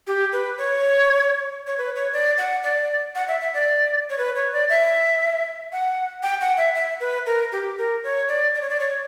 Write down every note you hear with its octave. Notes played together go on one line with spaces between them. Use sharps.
G4
B4
C#5
C#5
B4
C#5
D5
F#5
D5
F#5
E5
E5
D5
C#5
B4
C#5
D5
E5
F#5
G5
F#5
E5
E5
B4
A#4
G4
A#4
C#5
D5
D5
C#5
D5
C#5